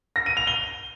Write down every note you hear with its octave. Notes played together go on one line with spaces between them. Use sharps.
A#6
D#7
F7
G7